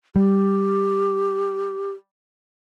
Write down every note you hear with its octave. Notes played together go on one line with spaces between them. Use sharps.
G3 G4